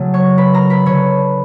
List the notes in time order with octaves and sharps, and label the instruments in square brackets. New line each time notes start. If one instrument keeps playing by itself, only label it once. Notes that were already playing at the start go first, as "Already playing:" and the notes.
Already playing: [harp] C#3 F#3 A3
C#5 C#6
B4 B5
A#4 A#5
B4 B5
D3 C#5